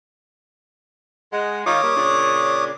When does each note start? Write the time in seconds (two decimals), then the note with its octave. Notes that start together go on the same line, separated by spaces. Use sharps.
1.33 G#3 F#5
1.66 D#3 D#4 F4 C#5 D6 D#6
1.83 G3 A#3
1.96 A#2 C#3 D4